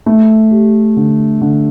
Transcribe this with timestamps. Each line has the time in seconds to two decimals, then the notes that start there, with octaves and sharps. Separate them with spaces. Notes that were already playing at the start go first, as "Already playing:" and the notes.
0.06 A3
0.51 G4
0.97 D3
1.41 D3